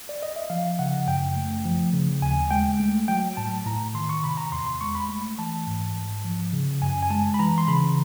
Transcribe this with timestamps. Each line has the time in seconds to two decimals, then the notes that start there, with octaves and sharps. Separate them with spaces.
0.09 D5
0.22 D#5
0.36 E5
0.50 F3 F5
0.79 C#3 F#5
1.07 F#2 G5
1.36 A3
1.65 F3
1.94 C#3
2.22 D#2 G#5
2.51 G#3 G5
2.80 A3
3.08 F#3 G5
3.37 A2 A5
3.66 A2 A#5
3.94 D#3 C6
4.09 C#6
4.23 C3 B5
4.37 A#5
4.52 E2 C6
4.66 C6
4.81 G#3 C#6
4.95 B5
5.09 A3 B5
5.39 E3 A5
5.67 G#2
5.96 G#2
6.24 F3
6.53 C#3
6.82 F#2 G#5
7.03 G#5
7.10 G#3 A5
7.34 B5
7.39 E3 A#5
7.58 C6
7.68 C#3 B5